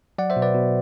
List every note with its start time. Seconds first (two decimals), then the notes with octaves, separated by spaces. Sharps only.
0.18 F#3 D5 F#5
0.30 C5 E5
0.36 B2
0.42 B4 D5
0.54 B2